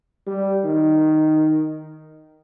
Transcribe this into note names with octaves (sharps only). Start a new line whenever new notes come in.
G3
D#3